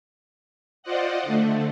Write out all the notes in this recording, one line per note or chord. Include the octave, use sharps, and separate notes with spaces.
F4 C5 D5 D#5 F#5
D3 A3